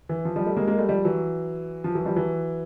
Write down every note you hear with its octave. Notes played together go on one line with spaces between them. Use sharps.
E3
F3
F3 G3
G3 A3
G#3 A#3
G#3 A#3
G3 A3
F3 G3
E3 F#3
F3
E3 F#3
F3 G3
E3 F#3